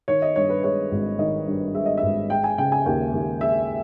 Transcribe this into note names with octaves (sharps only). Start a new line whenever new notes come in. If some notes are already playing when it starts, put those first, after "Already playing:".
D#3 C#5
D#5
G2 C#5
B4
G#3 C#5
G#1
D#3 D#5
G2
G#3 E5
D#5
E5
G#1
G#3 G5
G#5
C#3 G5
G#5
D#2 G5
D#2
G#3 E5